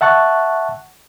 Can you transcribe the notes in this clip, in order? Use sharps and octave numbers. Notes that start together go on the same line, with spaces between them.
E5 F#5 A5 C#6 F#6